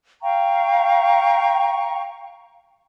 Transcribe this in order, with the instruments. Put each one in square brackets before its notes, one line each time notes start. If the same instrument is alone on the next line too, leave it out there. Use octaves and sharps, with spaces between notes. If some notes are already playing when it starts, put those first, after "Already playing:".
[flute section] F5 G5 A#5 C#6